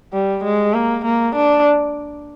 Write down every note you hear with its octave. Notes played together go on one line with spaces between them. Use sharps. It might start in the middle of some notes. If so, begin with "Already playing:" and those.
G3
G#3
A#3
A#3
D4